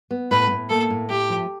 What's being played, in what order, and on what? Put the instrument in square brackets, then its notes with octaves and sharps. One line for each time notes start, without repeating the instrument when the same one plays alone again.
[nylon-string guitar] B3
[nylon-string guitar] A2 [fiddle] B4
[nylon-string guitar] A2
[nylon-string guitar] A#3 [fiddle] A4
[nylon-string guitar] A2
[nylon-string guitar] A3 [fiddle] G4
[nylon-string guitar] F3